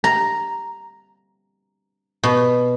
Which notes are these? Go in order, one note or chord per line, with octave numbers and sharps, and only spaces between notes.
A#5
B2